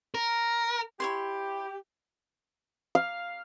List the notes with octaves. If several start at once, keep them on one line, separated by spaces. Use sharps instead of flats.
A#4
E4 G4 C#5 C6
F5